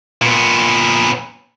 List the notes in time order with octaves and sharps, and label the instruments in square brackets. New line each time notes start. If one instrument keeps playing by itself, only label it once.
[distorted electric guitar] A#2 B3